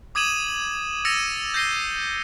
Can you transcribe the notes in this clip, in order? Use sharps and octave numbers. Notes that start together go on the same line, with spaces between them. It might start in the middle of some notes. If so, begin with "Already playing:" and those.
D6 D#6 G#6 D#7 E7 F#7
E6 A6 A#6 C#7 D#7 F7
G6 A#6 C7 D#7 G7